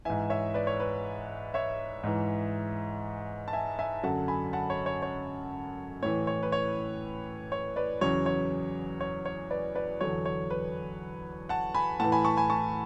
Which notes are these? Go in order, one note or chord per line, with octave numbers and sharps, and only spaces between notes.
G#2 E3 E5 G#5
C#5 E5
B4 D5
C#5
B4
C#5 E5
G#2 E3
A5
E5 G#5
E5 G#5
F#2 D3 F#3 F#5 A5
G#5 B5
F#5 A5
C#5
C#5
C#5
A2 E3 C#5
C#5
B4
C#5
C#5
B4 D5
E2 C#3 F#3 C#5
C#5
C#5
C#5
B4 D5
B4 D5
E2 D3 F#3 C#5
C#5
B4
F#5 A5
G#5 B5
A2 E3 F#5 A5
G#5 B5
A5 C#6
G#5 B5
A5 C#6